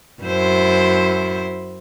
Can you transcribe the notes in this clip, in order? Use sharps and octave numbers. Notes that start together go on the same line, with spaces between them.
F#2 E4 C5